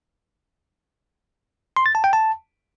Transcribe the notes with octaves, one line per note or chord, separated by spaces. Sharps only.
C6
A6
A5
G5
A5